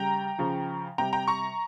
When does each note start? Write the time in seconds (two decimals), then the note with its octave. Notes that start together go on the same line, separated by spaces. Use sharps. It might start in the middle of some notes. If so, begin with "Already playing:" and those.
Already playing: C#3 G3 G5 A#5
0.38 C#3 F3
0.98 C3 G3 G5 A#5
1.13 G5 A#5
1.28 A#5 C#6